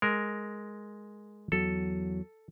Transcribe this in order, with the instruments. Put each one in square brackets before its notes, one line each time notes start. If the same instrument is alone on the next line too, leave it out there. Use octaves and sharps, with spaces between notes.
[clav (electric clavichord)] G#3 A#4
[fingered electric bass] E2 F#3 [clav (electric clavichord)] A4